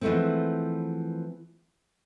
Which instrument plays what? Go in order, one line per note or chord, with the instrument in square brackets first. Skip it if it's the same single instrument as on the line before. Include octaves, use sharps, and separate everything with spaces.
[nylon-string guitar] E3 F3 G#3 A3 B3 C4